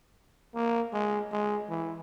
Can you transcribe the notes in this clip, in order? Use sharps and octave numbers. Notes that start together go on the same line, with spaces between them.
A#3
G#3
G#3
E3